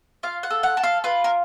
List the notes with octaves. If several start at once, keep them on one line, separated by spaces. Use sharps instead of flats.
F4 F5
F#5
A4
F#5
A4
F5
F4 B4
A#4